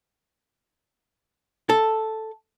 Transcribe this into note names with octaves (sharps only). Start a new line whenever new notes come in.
A4